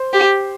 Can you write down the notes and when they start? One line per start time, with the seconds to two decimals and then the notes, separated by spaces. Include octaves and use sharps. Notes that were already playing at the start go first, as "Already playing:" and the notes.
Already playing: C5
0.13 G4